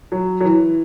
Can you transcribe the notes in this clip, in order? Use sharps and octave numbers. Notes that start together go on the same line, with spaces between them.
F#3
F#3
E3